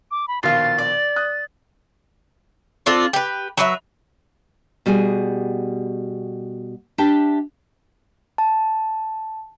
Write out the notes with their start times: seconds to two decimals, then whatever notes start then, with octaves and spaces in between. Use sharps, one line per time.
0.11 D6
0.28 B5
0.43 A#1 B2 D#3 F4 F5 A6
0.78 D5
1.16 D#6 F#6
2.86 C4 D4 F4 A4
3.13 G4 B4
3.57 F#3 B4 D5 E5
4.86 B2 G3 F#4 G#4
6.98 D4 G4 E5 G5 A5
8.38 A5